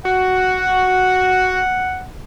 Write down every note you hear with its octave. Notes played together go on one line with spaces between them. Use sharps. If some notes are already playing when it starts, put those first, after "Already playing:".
F#4 F#5